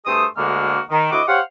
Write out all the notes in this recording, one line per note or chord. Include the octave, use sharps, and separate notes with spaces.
G2 A3 G#4 C5 D#6
D2 D3 G#3 A#3 F#4 F6
D#3
D2 E4 F#4 D#5 D6
G4 C5 C#5 F5 F#5